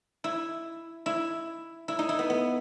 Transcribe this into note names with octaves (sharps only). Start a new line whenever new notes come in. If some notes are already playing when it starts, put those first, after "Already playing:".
E4
E4
E4
D#4
E4
B3
B3